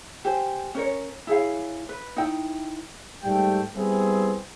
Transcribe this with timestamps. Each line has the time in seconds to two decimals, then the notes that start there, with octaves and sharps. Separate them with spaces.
0.25 G4 C5 G#5
0.75 C#4 A#4 C#5
1.27 E4 G#4 C#5 F5
1.89 B4
2.16 D#4 E4 G5
3.24 G#2 G3 A3 G5
3.74 G3 B3 C4 E4 G#4